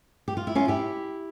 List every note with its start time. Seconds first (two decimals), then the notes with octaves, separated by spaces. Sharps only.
0.28 G4
0.37 F4
0.47 E4
0.55 C#4 F4
0.68 E4 G4